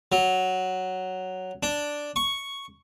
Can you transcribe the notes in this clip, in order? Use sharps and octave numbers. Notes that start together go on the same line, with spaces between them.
F#3
D4
C#6